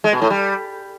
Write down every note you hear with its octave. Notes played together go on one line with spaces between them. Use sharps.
G#3
B2
A2
G3